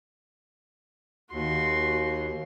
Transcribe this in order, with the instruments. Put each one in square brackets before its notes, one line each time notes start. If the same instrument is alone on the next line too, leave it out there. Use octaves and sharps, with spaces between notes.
[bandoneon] D#2 [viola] F#4 C6